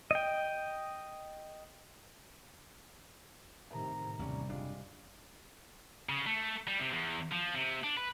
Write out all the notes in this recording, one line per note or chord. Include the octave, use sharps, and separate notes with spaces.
D#5 G5
A2 C3 D#3 A#5
A1 D#2 C3 G3 C#4
F#1 G#3 D4 F4
C#3
A3
G3
C3
E2
F3
C3
D4
B4